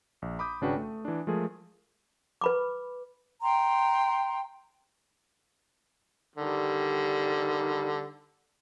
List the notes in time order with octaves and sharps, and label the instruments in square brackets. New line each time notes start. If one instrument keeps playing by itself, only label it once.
[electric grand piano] A#1
B5 D6 D#6 G6
G#1 C#3 D4 F#4 B4 G5
A3
E3 D4
F3 G#3 A3 G#4 A#4
[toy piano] B4 B5 D6
[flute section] G5 A#5 C6
[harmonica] D3 D#3 G3